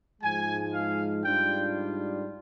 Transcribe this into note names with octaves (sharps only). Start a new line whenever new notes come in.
G#2 F3 G#3 G#5
F5
G#2 G3 D4 F4 G5